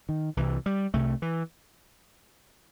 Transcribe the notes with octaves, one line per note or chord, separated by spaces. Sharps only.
D#3
C2 C3 E3
G3
C2 C3 A3
E3